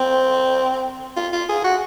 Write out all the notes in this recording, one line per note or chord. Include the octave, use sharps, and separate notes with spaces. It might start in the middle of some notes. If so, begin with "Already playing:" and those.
Already playing: C4
F4
F4
G#4
F#4